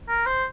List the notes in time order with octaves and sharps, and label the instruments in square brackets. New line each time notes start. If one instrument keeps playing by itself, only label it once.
[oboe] A#4
C5